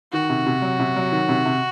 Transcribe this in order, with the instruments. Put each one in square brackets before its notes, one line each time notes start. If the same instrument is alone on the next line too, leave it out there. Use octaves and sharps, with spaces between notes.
[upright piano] D#3 [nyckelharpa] F#4
[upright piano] C3
C3
F#3
C3
F#3
D#3
C3
C3